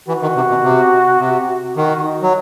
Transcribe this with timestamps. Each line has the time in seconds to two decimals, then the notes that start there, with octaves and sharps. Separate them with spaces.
0.08 E3 F#4
0.22 D#3
0.36 C3
0.50 B2
0.64 C3
1.20 C3
1.77 D#3 F#4
2.04 D#4
2.22 F#3